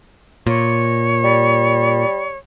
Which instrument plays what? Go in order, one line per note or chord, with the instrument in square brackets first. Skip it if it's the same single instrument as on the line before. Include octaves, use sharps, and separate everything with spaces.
[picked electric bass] A#2 [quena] C#5
[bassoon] G3